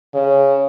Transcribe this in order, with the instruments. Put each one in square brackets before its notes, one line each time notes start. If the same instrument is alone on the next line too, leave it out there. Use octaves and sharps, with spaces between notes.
[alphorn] C#3